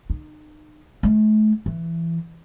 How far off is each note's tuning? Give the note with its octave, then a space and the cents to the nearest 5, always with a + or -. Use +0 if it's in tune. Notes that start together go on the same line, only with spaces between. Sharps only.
D#4 -35
A3 -40
E3 +15